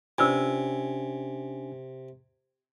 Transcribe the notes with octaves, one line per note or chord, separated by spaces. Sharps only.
C3 C#4 D4 F4 B4 G#5 E6